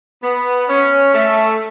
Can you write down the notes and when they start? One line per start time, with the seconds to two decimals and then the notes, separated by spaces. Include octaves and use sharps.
0.23 B3
0.69 C#4
1.14 A3